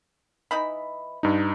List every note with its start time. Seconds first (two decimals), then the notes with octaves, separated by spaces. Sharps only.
0.51 E3 D#4 B5
1.23 G2 D#4